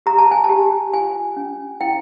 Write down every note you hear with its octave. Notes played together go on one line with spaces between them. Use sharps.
G4 A#5
A5
G#5
A5
G4
F4 G#5
C#4
E4 G5